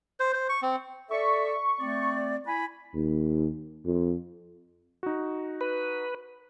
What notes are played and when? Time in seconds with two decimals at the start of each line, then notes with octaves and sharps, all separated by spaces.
0.20 C5
0.33 C5
0.49 C#6
0.62 C4
1.11 A4 D5 E5 C#6
1.79 A3 C4 D5
2.46 E4 G#5 B5
2.94 D#2
3.85 F2
5.03 D#4 F#4
5.61 B4